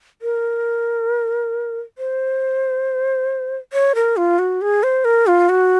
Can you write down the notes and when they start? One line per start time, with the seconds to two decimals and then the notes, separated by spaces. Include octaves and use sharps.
0.22 A#4
1.98 C5
3.73 C#5
3.95 A#4
4.17 F4
4.39 F#4
4.61 G#4
4.83 C5
5.05 A#4
5.27 F4
5.49 F#4